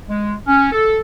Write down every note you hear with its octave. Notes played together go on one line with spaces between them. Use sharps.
G#3
C#4
A4